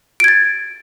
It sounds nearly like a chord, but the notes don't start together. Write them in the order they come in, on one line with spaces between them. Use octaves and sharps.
D7 G#6 A6